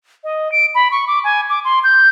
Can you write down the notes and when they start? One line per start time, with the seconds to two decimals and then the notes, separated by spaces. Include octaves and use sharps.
0.24 D#5
0.52 D7
0.75 B5
0.92 C#6
1.08 D6
1.24 G#5
1.50 D6
1.65 C6
1.84 G6